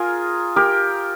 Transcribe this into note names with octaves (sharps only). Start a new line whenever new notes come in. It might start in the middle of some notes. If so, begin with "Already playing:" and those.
Already playing: F4 G#4 A#4
G4 A#4